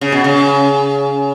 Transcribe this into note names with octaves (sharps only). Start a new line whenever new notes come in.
C#3
B2
C#3